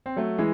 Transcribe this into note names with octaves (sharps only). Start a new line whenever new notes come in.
C4
F#3 A3
E3 G#3